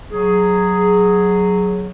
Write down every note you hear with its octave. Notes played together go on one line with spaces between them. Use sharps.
F#3 G#4